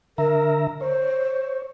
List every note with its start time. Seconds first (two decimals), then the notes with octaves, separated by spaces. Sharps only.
0.18 D3 A#4 E5 A#5
0.81 C5 C#5